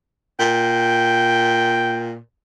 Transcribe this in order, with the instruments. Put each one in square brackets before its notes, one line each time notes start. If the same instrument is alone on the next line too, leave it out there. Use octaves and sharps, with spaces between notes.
[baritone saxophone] A#2 [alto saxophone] G5